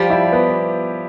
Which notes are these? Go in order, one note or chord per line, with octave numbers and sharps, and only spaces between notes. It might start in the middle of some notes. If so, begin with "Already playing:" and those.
Already playing: F3 G3 G4
E4
B3